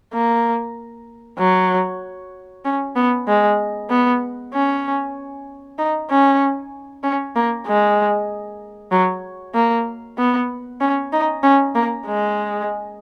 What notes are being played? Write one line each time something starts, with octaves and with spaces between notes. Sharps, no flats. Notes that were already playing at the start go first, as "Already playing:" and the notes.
A#3
F#3
C#4
B3
G#3
B3
C#4
D#4
C#4
C#4
A#3
G#3
F#3
A#3
B3
C#4
D#4
C#4
A#3
G#3